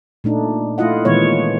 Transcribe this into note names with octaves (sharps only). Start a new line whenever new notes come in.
A#2 A3 D4 D#4
A3 E4 F4 D#5 F#5
A#2 D#3 E3 G#3 B3 C#5